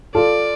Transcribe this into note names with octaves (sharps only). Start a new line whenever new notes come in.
F4 A4 D5